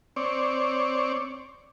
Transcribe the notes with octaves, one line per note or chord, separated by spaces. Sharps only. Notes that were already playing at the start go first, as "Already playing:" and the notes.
C4 C#5 D5